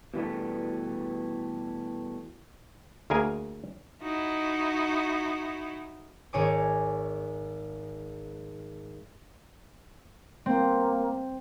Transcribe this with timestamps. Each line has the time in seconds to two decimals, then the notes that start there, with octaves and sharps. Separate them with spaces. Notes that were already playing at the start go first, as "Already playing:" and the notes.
0.14 B2 E3 G3 A3
3.10 D2 A#3 G#4 A#4 G#5
4.00 D#4 E4 F#4
6.33 G#1 C#5 G#5 D6
10.46 A#3 C4